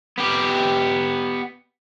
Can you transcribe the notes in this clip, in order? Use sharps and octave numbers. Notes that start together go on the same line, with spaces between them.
B3 G4